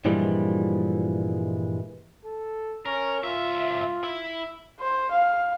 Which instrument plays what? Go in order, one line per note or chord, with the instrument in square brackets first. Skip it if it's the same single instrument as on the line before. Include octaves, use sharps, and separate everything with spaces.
[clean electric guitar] G2 A#2 E3 F3 G3 G#3
[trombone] A4
[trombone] C#4 [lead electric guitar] A#4
[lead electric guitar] C#2 E5 [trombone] F4
[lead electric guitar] E4
[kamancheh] C5
F5